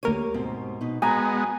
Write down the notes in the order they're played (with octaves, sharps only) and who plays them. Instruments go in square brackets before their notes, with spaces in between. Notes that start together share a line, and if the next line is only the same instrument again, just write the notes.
[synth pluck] D2 A#4 D#7 [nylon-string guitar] A#3 G4 C#5
[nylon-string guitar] G#2 B2 C4
B2 D#4
[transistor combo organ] G#3 B3 [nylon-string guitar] F#4 [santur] G#5 A#5